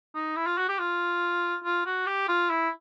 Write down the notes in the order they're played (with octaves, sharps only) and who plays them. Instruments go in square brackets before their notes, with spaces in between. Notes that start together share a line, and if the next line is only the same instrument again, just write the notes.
[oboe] D#4
E4
F4
F#4
G4
F4
F4
F#4
G4
F4
E4